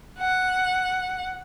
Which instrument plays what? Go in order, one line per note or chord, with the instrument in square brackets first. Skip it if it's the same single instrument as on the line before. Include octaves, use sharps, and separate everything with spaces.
[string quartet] F#5